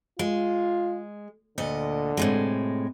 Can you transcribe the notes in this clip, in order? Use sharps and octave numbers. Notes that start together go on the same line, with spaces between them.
G#3 F4
D2 A#2 D3 D#5
A2 C3 G#3